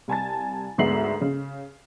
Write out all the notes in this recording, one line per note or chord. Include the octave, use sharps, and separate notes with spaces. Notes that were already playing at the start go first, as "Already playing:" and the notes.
C2 G#5 A5 A6
D2 G#2 B3 E5 C7 F#7
C#3